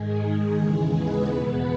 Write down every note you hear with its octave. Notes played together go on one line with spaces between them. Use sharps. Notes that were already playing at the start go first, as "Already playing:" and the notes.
Already playing: G#2 D#3 G#3 G#4
D#2 C#3 E3
B3 B4
E2 B2